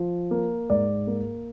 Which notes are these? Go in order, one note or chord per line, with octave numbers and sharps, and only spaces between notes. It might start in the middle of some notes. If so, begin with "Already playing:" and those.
Already playing: F3
A#3
G#2 D5
A#3